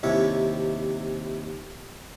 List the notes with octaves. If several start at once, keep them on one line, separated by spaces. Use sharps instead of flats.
D#2 C3 E4 C#5